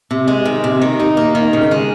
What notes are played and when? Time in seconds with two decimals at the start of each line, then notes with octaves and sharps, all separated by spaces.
0.11 C3
0.28 G#3
0.45 D#3
0.64 C3
0.81 D#3
1.00 D#4
1.17 A#3
1.35 D#3
1.53 C#3
1.71 G#3